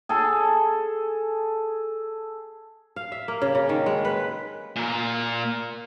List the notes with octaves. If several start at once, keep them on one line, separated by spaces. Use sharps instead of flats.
G#4 A4
F5
E5
A#3
C#3
C#3
D#3
G#3
B4
A#2 A#4